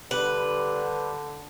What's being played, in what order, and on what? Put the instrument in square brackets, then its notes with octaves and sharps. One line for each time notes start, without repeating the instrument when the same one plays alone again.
[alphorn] D3 [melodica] G3 G4 [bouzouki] B4